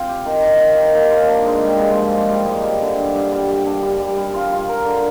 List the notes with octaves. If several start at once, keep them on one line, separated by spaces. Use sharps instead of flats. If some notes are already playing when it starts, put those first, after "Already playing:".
Already playing: C4 F4
G4
D#3
D#3
D#3
D#3
A#3
F4
D4
G#2
G3
G#3
F3
F3
G3
G#2
G3
D3
G2
G2
G3
G3
D4
G3
G3
G3
F4
F4
A#4
D3